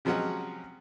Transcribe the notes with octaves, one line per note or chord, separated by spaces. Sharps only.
C3 F3 F#3 G#3 C#4 F#4